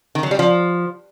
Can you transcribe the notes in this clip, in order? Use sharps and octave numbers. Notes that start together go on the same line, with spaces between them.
D#3
F#3
G3
F3